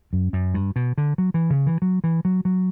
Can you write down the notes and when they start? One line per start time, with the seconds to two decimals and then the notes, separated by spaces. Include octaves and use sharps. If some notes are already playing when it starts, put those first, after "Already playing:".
0.13 F#2
0.33 F#2
0.54 G2
0.76 B2
0.98 D3
1.18 F#3
1.34 E3
1.50 C#3
1.66 E3
1.82 F#3
2.04 E3
2.25 F#3
2.45 F#3